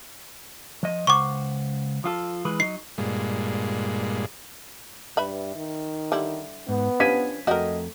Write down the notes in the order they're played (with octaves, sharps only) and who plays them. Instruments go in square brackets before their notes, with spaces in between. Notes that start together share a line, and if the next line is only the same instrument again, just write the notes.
[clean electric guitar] F3 D#5
[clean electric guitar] C#2 C5 F#5 [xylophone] C#6 D6
[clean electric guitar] F3 F4 A4
E3 G#3 B4
[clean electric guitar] F#3 D#4 [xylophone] C7
[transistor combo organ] G2 A#2 G#3
[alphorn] G2 [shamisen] B4 E5 B5
[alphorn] D#3
[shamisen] D3 G3 E4
[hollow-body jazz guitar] G#2 [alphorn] B3
[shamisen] F3 C#4 [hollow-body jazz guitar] D4 G4 B4 [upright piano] G#6 B6 D#7
[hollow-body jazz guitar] F2 G5 [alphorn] A3 [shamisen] F#4 A#4 [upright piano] D#5